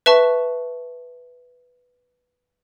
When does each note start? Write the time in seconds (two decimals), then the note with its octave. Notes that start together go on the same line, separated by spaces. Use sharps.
0.06 B4 E5 A5 C#6